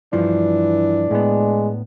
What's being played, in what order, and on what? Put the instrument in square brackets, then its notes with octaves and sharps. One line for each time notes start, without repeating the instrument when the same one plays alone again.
[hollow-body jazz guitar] G2 F3 [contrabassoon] E3 [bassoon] D4
[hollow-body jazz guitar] A2 B3 [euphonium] G#3